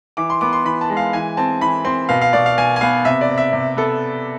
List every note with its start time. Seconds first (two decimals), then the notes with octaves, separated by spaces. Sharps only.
0.17 E3 D6
0.30 C6
0.41 B3 D6
0.53 C6
0.65 E3 B5
0.81 A5
0.90 G#3
0.97 F5
1.13 E3 G#5
1.37 C4 A5
1.61 E3 B5
1.85 C4 C6
2.09 B2 F5
2.21 F5
2.33 B2 D5
2.46 F5
2.57 B2 G#5
2.76 G#5
2.81 B3 F5
3.05 C3 E5
3.21 D5
3.29 C3
3.38 E5
3.53 C3
3.77 B3 A4